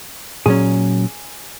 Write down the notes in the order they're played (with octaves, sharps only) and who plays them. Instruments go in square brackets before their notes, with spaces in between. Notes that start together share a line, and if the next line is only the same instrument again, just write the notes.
[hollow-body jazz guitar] A#2 F#3 C#4 G#4